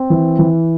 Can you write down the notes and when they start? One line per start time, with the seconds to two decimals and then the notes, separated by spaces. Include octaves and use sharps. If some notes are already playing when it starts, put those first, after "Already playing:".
Already playing: C4
0.10 E3
0.39 E3